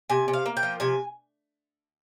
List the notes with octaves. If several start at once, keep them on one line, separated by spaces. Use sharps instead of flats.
C3 G#5
C3
F5
A#3
G5
F3
C3 G#5